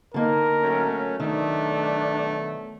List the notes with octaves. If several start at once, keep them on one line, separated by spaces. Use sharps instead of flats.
D3 A#3 D#4 A#4
F#3 A3 C#4
B2 D#3 F#3 A3 D4